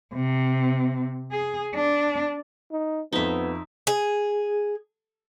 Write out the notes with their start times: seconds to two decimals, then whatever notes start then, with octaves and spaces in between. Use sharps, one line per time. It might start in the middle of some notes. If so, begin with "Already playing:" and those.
0.13 C3
1.31 G#4
1.75 D4
2.72 D#4
3.13 F2 F3 B3 D#4 E5
3.87 G#4